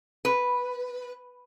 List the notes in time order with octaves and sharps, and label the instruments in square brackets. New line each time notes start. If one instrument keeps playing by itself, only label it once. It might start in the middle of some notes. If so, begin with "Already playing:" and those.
[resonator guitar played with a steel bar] B4